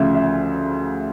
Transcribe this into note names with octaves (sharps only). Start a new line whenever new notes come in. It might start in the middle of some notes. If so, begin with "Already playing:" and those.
Already playing: D2 C#3 F3 E5
E5